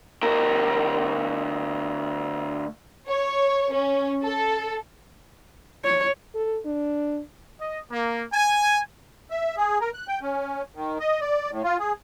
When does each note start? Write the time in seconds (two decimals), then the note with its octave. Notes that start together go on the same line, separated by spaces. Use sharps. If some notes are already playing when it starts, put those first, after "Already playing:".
0.23 D2 A#4
3.10 C#5
3.73 C#4
4.23 A4
5.84 C#5
6.35 A4
6.65 D4
7.60 D#5
7.91 A#3
8.32 G#5
9.31 E5
9.57 G#4
9.81 A#4
9.94 F#6
10.08 G5
10.21 C#4
10.75 D#3
11.00 D#5
11.21 D5
11.51 A2
11.64 F4
11.79 G#4